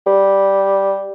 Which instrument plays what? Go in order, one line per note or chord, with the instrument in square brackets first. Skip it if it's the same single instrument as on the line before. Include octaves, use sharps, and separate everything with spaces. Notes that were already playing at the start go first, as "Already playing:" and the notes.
[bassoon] G3